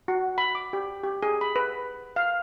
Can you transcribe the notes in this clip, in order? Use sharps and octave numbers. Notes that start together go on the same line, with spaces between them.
F#4
B5
D6
G4
G4
G#4
B5
B4
F5